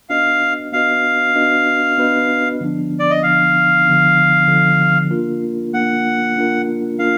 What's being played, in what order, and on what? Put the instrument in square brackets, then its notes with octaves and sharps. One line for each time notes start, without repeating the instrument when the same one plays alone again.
[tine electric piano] B3 D4 F#4 B4 D#5 [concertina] F5
[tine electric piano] B3 D4 F#4 B4 D#5 [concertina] F5
[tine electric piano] B3 D4 F#4 B4 D#5
B3 D4 F#4 B4 D#5
D3 F3 B3 D4
[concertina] D5
D#5
[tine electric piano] D3 F3 B3 D4 [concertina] F5
[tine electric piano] D3 F3 B3 D4
D3 F3 B3 D4
A#3 D4 F4 A#4
[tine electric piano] A#3 D4 F4 A#4 [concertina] F#5
[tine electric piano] A#3 D4 F4 A#4
[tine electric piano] A#3 D4 F4 A#4 [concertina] F5